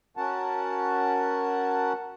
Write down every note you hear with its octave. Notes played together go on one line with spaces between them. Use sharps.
C#4 F#4 A#4 F#5 A5